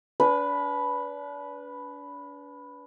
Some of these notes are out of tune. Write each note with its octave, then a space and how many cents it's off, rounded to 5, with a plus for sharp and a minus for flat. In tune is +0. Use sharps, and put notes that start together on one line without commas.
D4 -35 B4 +0